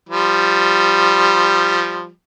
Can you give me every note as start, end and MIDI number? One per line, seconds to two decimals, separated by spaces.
0.09 2.09 53
0.09 2.09 55